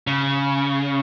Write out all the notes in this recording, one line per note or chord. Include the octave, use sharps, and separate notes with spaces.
C#3